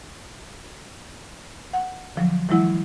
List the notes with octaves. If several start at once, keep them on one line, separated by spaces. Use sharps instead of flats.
F#5
D3 F3 F#3
E3 F#3 G#3 E4 F#5